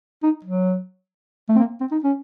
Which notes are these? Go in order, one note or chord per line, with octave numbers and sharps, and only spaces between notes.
D#4
F#3
A3
C4
A#3
C4
D#4
C#4